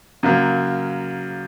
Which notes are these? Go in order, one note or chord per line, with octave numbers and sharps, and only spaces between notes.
F#2 C#3 F#3 A#3